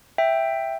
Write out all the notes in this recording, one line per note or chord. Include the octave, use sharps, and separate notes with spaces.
E5 G5